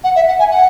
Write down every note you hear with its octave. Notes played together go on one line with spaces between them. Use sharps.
F#5
E5
F#5
G#5
F#5